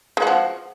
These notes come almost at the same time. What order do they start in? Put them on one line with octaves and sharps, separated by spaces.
G#3 F#4 F3